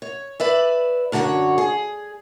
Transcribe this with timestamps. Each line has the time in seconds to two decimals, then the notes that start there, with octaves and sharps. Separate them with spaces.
0.02 C#5
0.40 B4 D5 E5
1.12 F#2 D3 F#4 A4 C#5
1.58 G#4